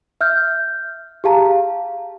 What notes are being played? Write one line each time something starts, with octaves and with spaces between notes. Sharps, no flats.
E5 F6 G6
G4 G#4 F5 A5 A#5
F5